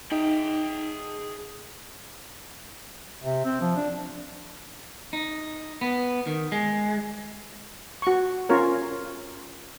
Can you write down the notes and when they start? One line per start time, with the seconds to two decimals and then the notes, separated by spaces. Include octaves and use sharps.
0.12 D#4 G#4 E5 G5
3.23 C3
3.45 C4
3.61 F3
3.76 D4
5.13 D#4
5.81 B3
6.27 D#3
6.52 G#3
8.02 F#4 C#6
8.49 C#4 F4 A#4 C#5